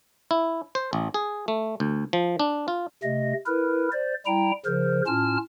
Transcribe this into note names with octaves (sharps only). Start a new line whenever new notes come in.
E4
C5
A1
G#4
A3
D2
F3
D4
F4
C3 A3 D#5
E4 A#4 B4
C5 D5
G3 E4 G5 A#5
C#3 F3 A#4 C5
A2 C#4 F4 A5 F6